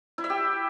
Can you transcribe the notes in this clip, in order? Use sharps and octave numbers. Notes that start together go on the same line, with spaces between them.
E4
E5
G4